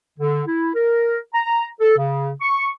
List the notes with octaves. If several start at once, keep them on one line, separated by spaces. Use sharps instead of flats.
D3
E4
A#4
A#5
A4
C#3
C#6